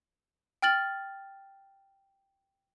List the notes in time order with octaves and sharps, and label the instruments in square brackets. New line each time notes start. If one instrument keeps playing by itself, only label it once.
[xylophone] G5 F6 A6 F#7